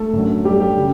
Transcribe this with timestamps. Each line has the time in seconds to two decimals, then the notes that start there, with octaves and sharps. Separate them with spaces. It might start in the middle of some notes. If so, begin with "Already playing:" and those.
Already playing: A3 A4
0.13 F#2 D3 F#3
0.45 G3 G4
0.60 G3 G4
0.77 C#3